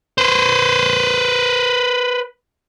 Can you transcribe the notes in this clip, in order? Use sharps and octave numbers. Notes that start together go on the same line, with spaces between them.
B4 C5